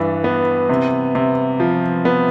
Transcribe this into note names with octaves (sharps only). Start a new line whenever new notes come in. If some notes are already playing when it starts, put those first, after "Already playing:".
Already playing: G2 E3 D4
B3
C3
C3
F3
B3